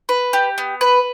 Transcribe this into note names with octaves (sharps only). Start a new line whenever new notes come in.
B4
G4
B3
B4